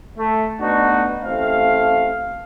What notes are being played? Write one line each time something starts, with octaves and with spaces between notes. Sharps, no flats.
A3
A3 B3 D4 D#4 F#4
A1 A3 C4 F5